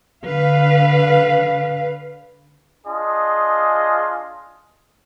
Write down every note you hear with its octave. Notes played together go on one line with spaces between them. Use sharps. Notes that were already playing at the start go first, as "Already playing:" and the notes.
D3 B4 F5
D4 F4 G#4 D#5